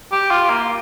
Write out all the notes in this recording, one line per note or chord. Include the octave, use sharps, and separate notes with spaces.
G4
F4
A#3